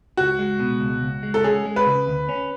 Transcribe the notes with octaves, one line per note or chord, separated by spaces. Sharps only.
C#2 F#4
G#3
B2
C#2
C#2
G#3
A4
C#4 G#4
G#3
B4
C#3
D2
C#4